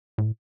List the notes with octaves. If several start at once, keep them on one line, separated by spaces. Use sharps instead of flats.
A2